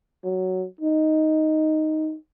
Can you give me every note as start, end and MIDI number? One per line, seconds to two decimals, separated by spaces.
0.24 0.65 54
0.81 2.16 63